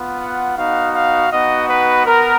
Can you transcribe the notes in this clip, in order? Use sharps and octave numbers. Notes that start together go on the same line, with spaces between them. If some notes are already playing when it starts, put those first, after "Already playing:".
Already playing: B3 F4
F#5
B3 D#4 F#4 F5
F5
B3 D#4 F#4 D#5
B4
B3 A#4